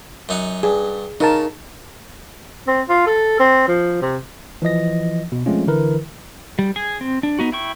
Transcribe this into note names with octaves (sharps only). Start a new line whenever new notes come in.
F#2 D#4 F#5
G2 G#4
C#3 D#4 A#4 A5
C4
F4
A4
C4
F3
C3
E3 F3 D#5 A#6
B2
F3 G#3 A3 C4 C#4 F4
D3 E3 E4 A#4 B4
G3
G#4 G#5
C4
D4
B3 D#4 F#4
E4 G5 C#6